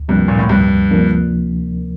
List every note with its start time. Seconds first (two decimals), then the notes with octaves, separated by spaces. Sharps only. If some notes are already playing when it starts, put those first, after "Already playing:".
Already playing: D2
0.09 G2 C3 F3 A#3 D4
0.28 A#2
0.39 A2
0.49 D2 G2
0.91 C3 F3 A#3 D4